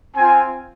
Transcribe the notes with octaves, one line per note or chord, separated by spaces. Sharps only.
C4 F4 G#5